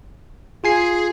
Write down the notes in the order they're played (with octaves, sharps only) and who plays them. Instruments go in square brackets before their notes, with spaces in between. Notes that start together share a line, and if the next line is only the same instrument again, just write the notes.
[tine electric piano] F4 G#5 C7 [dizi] G#4